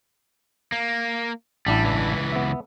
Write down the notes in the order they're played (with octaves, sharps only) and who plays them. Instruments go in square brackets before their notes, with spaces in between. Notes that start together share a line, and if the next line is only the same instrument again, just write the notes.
[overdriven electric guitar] A#3
[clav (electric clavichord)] A1 D4 E4 [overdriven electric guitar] G3
[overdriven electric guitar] C#2 E3
[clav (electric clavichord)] B3 E5